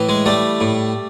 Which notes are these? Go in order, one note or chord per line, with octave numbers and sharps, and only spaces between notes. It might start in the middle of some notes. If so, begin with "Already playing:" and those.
Already playing: A2 E3
G#3
G3 A3
A2